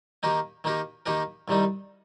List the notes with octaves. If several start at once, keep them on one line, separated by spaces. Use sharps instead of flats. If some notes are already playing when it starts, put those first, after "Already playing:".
D#3 A#3 D#4 G4 A#4
D#3 A#3 D#4 G4 A#4
D#3 A#3 D#4 G4 A#4
C2 C3 D#3 G3 D#4